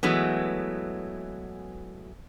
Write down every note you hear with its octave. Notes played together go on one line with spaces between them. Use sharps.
E3 F#3 G#3 A3 B3